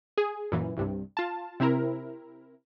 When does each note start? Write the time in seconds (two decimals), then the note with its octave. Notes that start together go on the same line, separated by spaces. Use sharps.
0.18 G#4
0.52 F#2 A#2 E3
0.77 C2 G2 C3
1.17 F4 A5
1.60 C3 C4 E4 A#4